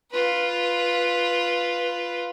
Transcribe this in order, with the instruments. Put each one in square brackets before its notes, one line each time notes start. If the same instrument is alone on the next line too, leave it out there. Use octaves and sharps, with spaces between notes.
[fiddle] F4 B4